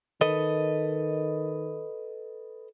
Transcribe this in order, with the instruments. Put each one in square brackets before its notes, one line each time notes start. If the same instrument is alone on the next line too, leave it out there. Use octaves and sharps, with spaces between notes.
[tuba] D#3 [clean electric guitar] A4 B4 D#5